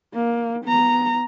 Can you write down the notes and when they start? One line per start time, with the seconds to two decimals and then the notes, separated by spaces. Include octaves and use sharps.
0.14 A#3
0.65 B3 A#5